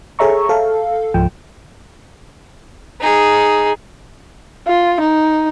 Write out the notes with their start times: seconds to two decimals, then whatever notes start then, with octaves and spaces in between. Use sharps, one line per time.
0.19 G#4 A4 C#5 E5 A#5 C#6
0.49 A4 F5
1.14 C#2 G#2 F3 G5
3.01 D#4 G#4
4.67 F4
5.01 D#4